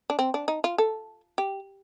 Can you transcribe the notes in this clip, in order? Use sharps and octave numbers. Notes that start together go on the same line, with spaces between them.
D4
C4
D4
D#4
F4
A4
G4